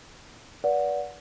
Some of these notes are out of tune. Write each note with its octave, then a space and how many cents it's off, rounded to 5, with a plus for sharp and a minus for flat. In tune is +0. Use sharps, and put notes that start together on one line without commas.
B4 -35 D5 -25 F#5 -20